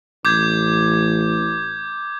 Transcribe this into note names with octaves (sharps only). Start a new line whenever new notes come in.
A1 D6 G6 G#6